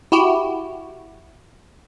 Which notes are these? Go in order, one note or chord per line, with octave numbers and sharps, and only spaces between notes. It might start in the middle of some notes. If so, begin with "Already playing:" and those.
E4 F#4 G4